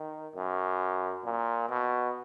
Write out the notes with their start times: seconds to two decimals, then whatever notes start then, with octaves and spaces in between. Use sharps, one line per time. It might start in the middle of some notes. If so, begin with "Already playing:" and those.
Already playing: D#3
0.36 F#2
1.25 A#2
1.69 B2